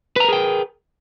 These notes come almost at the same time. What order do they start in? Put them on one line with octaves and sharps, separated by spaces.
B4 A#5 A#4 G#4 G5